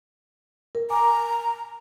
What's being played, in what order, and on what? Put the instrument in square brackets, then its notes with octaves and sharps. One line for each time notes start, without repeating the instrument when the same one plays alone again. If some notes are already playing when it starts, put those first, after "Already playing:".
[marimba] A#4
[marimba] G#5 D6 [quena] A#5